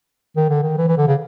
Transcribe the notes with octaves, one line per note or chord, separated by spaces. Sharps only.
D#3
D3
D#3
E3
E3
D3
C#3